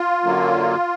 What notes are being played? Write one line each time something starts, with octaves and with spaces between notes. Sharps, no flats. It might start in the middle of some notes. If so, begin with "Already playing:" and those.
Already playing: F4
F#2 D3 F#3 A#3